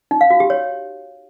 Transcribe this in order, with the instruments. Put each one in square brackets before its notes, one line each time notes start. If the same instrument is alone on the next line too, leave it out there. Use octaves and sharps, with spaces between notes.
[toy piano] D#4
F5
F#4
G4
C#5